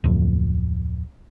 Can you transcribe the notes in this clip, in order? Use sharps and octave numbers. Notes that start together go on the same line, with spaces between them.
D1 F2